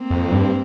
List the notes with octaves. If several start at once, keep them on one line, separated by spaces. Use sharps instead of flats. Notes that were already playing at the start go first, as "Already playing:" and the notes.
Already playing: A#3 C4
F2
G2